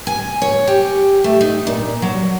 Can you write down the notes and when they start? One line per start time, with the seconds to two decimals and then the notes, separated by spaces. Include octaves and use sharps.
0.07 G#5
0.42 C#5
0.68 G4
1.24 A3
1.41 D#4
1.67 A#2
2.02 F#3